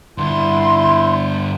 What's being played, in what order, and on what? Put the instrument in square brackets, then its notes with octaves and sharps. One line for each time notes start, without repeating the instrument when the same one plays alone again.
[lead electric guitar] G2 D3 [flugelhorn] E4 [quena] C6